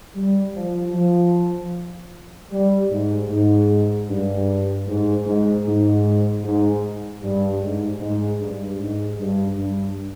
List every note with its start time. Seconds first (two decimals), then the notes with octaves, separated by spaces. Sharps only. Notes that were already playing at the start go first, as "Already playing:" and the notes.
0.16 G3
0.55 F3
0.94 F3
2.51 G3
2.90 G#2
3.29 G#2
4.08 G2
4.87 G#2
5.26 G#2
5.66 G#2
6.44 G#2
7.22 G2
7.61 G#2
8.00 G#2
8.40 G2
8.79 G#2
9.19 G2
9.58 G2